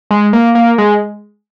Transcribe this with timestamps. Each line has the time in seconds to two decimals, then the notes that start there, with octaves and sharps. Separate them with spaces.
0.11 G#3
0.33 A#3
0.55 A#3
0.78 G#3